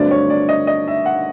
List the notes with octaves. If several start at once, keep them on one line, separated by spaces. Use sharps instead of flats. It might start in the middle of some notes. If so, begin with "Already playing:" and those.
Already playing: G2 D3 F#3 A3 C4 D5
C#5
D5
D#5
D#5
E5
F#5